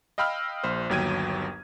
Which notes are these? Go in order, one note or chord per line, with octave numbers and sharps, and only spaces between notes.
D#5 F5 G5 B5 E6 F6
A#1 C5
G1 D#2 F#3 G5 G#6 D#7